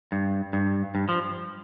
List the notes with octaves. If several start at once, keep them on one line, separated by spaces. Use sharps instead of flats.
G2
G2
G2
F3